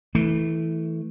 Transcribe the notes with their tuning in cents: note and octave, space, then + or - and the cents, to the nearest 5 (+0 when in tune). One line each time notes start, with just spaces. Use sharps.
E3 -20 A3 +0